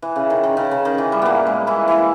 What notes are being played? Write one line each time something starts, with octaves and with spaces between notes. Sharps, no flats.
E3
C#3
D#3
D#3
C#3
C#3
D#3
E3
G3
A#2 A#3 B3
G#3
E3 E4
E3 E4